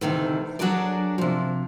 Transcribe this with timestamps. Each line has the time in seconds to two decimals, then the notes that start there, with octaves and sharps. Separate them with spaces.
0.01 D2 C3 D#3 E3
0.59 F#3 D4 F#4 G#4 A#4 D5
1.18 C3 F3